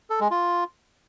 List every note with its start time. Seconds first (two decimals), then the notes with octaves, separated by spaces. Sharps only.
0.10 A4
0.20 G#3
0.31 F4